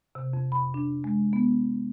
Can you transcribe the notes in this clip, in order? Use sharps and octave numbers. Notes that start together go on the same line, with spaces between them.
C3
F2
B5
D4
G#3
B3